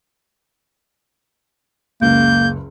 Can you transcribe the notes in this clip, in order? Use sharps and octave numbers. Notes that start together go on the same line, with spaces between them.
F#1 C#2 A#3 G6